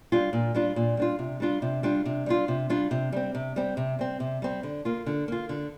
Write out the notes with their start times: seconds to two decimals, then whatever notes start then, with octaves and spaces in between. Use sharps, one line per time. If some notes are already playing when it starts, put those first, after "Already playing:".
0.12 G3 D4 F4
0.33 A#2
0.55 G3 D4 F4
0.76 A#2
0.97 G3 D4 F4
1.19 C3
1.40 G3 D4 F4
1.62 C3
1.83 G3 D4 F4
2.06 C3
2.26 G3 D4 F4
2.48 C3
2.70 G3 D4 F4
2.91 C3
3.12 G3 C4
3.35 C3
3.56 G3 C4
3.77 C3
3.99 G3 C4
4.20 C3
4.42 G3 C4
4.63 D3
4.85 A#3 F4
5.06 D3
5.28 A#3 F4
5.49 D3